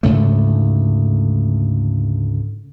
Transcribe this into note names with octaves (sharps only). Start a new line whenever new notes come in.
D2 G#2 C#3 A3